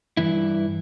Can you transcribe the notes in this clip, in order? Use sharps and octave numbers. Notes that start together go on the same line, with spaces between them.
G2 E3 E4